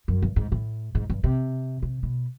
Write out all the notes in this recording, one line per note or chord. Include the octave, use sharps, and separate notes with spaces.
F#2
G2
G#2
A2
G#2
G2
C3
C3
B2